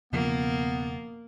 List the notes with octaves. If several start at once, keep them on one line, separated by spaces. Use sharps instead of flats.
E1 C#3 F3 A#3 B3